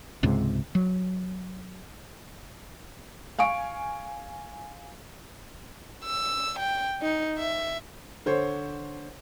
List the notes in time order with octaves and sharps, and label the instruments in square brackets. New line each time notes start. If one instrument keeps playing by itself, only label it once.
[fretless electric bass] C#2 G#2 C3
F#3
[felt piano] F5 G#5 C#6 D7
[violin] E6
G5
D#4
E5
[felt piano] D3 C5 C#5